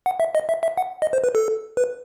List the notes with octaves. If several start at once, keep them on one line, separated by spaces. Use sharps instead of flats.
F#5
E5
D#5
E5
E5
F#5
D#5
C5
B4
A4
B4